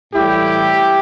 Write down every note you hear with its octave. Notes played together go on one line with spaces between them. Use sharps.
A2 E3 G3 E4 G4